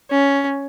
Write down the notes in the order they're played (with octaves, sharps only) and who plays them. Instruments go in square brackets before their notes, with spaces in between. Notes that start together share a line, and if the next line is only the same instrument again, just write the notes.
[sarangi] C#4